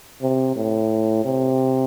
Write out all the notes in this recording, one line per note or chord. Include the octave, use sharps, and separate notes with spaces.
C3
A2
C3